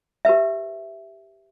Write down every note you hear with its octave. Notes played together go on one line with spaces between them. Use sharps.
G4 A#4 B4 E5